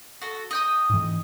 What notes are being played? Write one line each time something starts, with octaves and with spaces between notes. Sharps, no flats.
F#4 A4
D#5 G5 D#6
G#2 E3